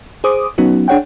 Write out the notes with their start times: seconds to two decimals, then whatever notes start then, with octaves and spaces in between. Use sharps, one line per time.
0.24 G#4 C5 D6 D#6
0.58 F#3 B3 C#4 D#4 F#4
0.88 D4 G#4 C#5 F#5 G5